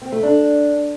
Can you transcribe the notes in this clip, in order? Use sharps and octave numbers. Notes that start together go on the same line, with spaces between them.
C4
A3
D4